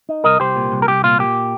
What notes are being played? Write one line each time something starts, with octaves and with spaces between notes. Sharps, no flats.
D#4
C2 A#4 D#5
C2 G4 C5
A#2
C2
A#4
C2 G4
A#2 F4
A#2 G4